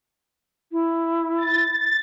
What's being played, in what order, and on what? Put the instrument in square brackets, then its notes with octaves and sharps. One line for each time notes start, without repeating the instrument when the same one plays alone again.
[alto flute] E4
[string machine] A6